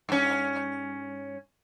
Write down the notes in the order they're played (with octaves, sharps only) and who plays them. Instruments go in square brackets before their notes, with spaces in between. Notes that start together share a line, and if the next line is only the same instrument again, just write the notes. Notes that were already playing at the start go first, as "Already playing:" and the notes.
[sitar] G2 C#4